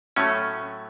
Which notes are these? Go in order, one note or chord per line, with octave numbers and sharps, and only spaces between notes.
A2 F#3 A3 C#4